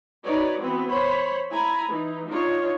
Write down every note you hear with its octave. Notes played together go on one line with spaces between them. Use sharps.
D#4 F#4 B4 C#5 D5
E3 B3 C4 F#4 B4
C5 C#5 B5
E4 G#5 A#5 B5
E3 D#4
D4 D#4 F4 C#5